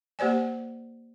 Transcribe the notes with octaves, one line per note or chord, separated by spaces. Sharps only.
A#3 G4 C5 D5 G#5